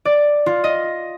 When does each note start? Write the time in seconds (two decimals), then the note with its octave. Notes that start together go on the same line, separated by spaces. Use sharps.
0.05 D5
0.46 F4
0.64 D#5